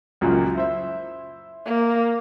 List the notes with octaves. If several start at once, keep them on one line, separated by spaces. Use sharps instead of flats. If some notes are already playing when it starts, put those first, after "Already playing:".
C#2 F#2 A#2
E4 C5 E5
A#3